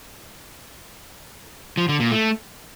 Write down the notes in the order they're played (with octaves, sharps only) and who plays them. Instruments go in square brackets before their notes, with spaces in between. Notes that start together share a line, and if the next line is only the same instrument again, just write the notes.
[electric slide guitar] F3
D3
A#2
A3